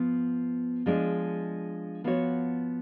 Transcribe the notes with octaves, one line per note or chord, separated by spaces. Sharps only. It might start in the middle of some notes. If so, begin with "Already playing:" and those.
Already playing: F3 B3
F3 G#3 D4
F3 B3 F#4 C#5